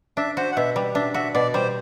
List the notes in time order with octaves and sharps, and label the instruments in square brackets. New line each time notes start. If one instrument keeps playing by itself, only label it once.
[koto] D4 [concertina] E5
[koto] F#4 [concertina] C5
[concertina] F#5
[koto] B2 [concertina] E5
[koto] G3
[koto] D4 [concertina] E5
[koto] F#4 [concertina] E5
[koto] B2 [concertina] D5
[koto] G3 [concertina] C5